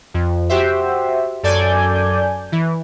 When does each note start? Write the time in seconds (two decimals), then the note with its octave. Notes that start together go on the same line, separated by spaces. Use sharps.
0.14 F2
0.49 F#4 G4 C5 E5
1.43 F#2 A4 D5 G#5 G6
2.52 E3